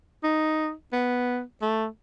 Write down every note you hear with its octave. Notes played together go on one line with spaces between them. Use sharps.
D#4
B3
A3